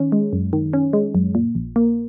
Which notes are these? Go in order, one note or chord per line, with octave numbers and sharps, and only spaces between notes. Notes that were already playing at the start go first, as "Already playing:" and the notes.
Already playing: D#3 C#4
G#3
F#2
D#3
C#4
G#3
F#2
A#2
A#1
A#3